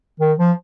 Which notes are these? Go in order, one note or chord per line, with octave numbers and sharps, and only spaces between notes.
D#3
F3